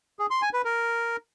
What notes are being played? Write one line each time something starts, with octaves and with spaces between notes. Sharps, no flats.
G#4
C6
G#5
B4
A#4